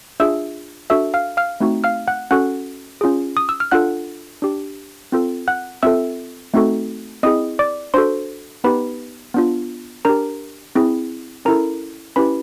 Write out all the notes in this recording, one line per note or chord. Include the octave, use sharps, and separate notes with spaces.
D4 F4 G#4 E5 E6
D4 F#4 A4 E5 E6
F5 F6
F5 F6
A3 C4 D#4 F#4
F5 F6
F#5 F#6
C#4 F#4 A4 F#5 F#6
C#4 F4 G#4
D#6
E6
F6
D4 F4 A4 F#5 F#6
D4 G4
C4 F4 A4
F#5 F#6
C4 F4 A4 E5 E6
A3 C4 D#4 F#4 A4
C4 E4 G#4 D#5 D#6
D5 D6
D4 F#4 A4 C5 C6
B3 D#4 G4 B4 B5
B3 D4 F4
D4 G4 A#4 A#5
C4 E4 G#4
C#4 E4 A4 A#4 A#5
C#4 E4 G4 B4 B5